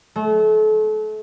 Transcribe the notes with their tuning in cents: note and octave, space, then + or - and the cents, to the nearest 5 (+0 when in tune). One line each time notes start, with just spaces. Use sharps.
A3 -35